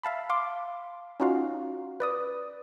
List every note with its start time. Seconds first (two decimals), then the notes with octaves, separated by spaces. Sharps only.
0.03 E5 F5 A5 B5
0.29 F5 C6 D6
1.20 C#4 D#4 F4 F#4 F5
2.00 B4 D5 D#6